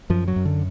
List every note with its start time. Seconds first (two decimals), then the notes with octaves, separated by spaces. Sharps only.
0.10 F#2 F3
0.28 F#3
0.36 F#2
0.45 D3